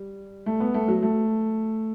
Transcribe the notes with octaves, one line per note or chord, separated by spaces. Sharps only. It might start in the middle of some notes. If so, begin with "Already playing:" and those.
Already playing: G3
A3
B3
A3
F#3
A3